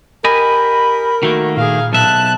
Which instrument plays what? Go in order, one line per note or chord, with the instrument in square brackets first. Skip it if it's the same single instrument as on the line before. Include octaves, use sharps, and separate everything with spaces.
[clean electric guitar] G4 D#5 G#5 [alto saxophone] A#4 [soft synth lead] B5
[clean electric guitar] D#3 A3 A#3 [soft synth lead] F#4
[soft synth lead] A#2 [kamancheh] G#4 F5
[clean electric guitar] B1 E5 [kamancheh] A5 F#6